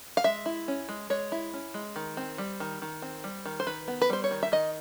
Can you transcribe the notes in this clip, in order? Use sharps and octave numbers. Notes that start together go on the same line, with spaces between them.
F5
G#3 E5
E4
C#4
G#3
G#3 C#5
E4
C#4
G#3
D#3
C4
G3
D#3
D#3
C4
G3
D#3
C5
D#3 B4
B3
B4
G3 C5
C#5
D#3
E5
D#3 D#5